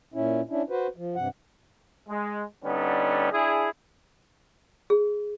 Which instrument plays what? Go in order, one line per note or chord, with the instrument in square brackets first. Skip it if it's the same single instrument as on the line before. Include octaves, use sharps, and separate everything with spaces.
[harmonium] A#2 C#4 E4
C#4 D4 E4
F#4 B4 C5
F3
G2 C3 F#5
[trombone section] G#3
D3 G3 B3 C#4 D#4
D4 E4 G#4
[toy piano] G#4